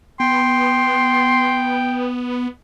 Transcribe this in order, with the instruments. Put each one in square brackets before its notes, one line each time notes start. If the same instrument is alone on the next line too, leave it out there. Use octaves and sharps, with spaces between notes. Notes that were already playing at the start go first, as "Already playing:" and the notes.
[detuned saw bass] B3 [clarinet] G5 [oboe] C6